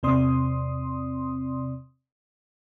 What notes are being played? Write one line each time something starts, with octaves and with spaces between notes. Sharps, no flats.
E2 C3 C4 D5 C6 D#6